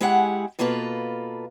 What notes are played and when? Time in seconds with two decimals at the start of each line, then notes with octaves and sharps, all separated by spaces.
0.01 G#3 E4 G4 G#4 F#5
0.59 B2 A#3 F4 A4 B4